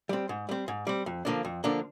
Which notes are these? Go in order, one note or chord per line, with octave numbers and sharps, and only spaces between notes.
G3 C4
G#2
G3 C4
G#2
G3 C4
F2
D3 F3 A#3 D4
F2
D3 F3 A#3 D4